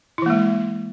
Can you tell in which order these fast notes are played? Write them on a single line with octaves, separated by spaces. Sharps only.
E4 E3 A#3 G#3